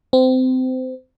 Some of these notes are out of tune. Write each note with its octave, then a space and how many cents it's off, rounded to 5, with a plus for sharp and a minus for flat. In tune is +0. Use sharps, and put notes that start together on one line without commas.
C4 -25